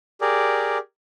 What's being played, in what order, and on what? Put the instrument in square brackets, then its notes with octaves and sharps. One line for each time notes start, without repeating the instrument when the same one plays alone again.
[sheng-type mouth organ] G4 G#4 A#4 D5